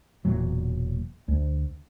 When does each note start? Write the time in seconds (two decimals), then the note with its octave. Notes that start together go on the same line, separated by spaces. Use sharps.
0.25 E1 E2 A#2 F#3
1.28 D2